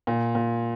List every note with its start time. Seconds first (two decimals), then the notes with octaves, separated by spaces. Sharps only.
0.07 A#2
0.35 A#2